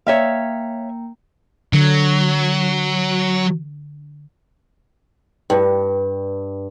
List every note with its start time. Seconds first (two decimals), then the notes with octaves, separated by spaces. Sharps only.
0.07 A#3 C#5 E5 F5 G5 A#5
1.73 D3 F#3
5.50 G2